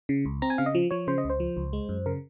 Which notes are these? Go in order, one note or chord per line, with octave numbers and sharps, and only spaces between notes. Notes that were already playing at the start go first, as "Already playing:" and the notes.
C#3
C#2
C4 A#5
G#5
C#3 F5
D#5
F3
F3 C#5
C#3 C5
D#5
C#2
C5
F3
C#2
G#3
F#2
C#3 A#4